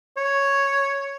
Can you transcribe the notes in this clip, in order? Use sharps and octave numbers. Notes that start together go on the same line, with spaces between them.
C#5